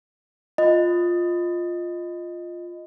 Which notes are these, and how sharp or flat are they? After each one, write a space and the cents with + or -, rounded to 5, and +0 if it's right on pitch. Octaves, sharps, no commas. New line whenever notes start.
F4 +0 D#5 +0